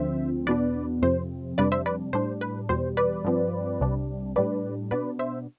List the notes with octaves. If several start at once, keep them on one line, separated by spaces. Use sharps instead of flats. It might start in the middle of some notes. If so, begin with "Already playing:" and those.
Already playing: D2 D3 F3 C4 C5 E5
E2 B2 B3 D4 B4 D5
F2 C3 F3 C4 C5
F2 C3 G3 D4 B4 D5
C5 E5
B4 D5
A2 G3 D4 C5
B4
E2 B2 G3 C5
B4 D5
G2 F3 C4
C2 C3 G3 D4
A2 G3 D4 B4 D5
B2 B3 D4 B4 D5
C5 E5